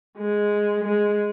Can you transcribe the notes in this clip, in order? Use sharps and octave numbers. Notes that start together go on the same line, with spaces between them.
G#3
G#3